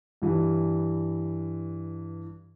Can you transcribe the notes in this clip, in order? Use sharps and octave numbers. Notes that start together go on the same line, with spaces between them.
G2 E3